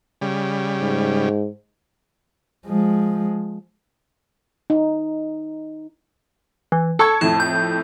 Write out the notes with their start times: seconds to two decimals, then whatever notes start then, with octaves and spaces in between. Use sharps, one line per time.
0.21 C#3 G3
0.81 G#2
2.67 F3 G#3
4.70 D#4
6.72 E3
6.99 A4 A5 C#6 G#6
7.21 F2 A2 A5
7.40 G6